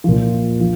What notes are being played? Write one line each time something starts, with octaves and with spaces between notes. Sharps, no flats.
A#2 F3
F3